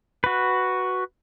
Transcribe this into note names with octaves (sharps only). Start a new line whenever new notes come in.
F#4 B4